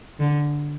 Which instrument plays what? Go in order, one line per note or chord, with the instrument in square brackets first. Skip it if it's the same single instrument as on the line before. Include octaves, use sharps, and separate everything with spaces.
[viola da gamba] D3